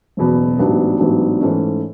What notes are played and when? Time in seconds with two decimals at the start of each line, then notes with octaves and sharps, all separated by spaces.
0.17 F#1 E2 B2 F#3
0.58 A1 G#2 F#3 B3 D4
1.00 A1 G#2 F#3 B3 D4
1.41 G#2 E3 A3 C#4